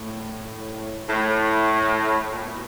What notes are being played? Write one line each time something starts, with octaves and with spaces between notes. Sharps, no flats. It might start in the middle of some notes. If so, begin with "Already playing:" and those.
Already playing: A2
A2
A#2
B2